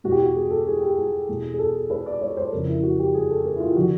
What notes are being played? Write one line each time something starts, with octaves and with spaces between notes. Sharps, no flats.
E2 B2 F#4
G4
F#4
G#4
A4
G#4
G4
G#4
E2 B2
G#4
A4
B4
D5
C#5
C5
F2 C#3 E3 A#4
E4
F#4
G4
G#4
A4
A#4
E4
F4
D3 F3 F#4